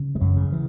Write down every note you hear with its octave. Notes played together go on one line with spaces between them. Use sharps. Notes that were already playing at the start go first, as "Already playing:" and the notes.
Already playing: C#3
G#3
F#2 F#3
C#3
E3